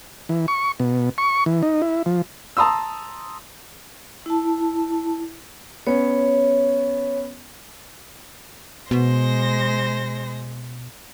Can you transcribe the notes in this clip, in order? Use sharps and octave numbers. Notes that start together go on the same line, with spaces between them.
E3
C#6
B2
C#6
E3
D#4
E4
F3
A5 A#5 C6 D#6 E6
E4 A5
B3 C#4 C#5
B2 G#3 C5 A#6